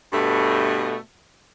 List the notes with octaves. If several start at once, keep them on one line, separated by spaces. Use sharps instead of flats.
G2 B2 A3